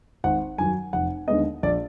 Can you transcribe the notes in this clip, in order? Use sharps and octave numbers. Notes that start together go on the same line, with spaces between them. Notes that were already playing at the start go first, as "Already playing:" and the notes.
G#1 F#5
F#2 D#3 F#3 G#5
F1 F#5
D#2 D3 G#3 B3 D#5
A#1 D5